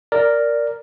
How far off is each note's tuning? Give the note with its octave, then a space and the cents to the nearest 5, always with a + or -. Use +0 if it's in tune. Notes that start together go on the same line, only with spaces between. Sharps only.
A#4 -5 D5 -5